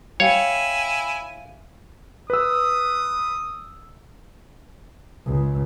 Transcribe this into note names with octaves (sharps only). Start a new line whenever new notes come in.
E4 C#5 E5 F5 G5 G#5
B4 D#6 E6
C#2